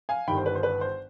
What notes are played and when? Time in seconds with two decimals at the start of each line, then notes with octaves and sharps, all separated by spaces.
0.09 F5 G#5
0.28 G1 G2 D#3 G5 B5
0.37 C5
0.46 B4
0.55 C5
0.63 B4
0.81 C5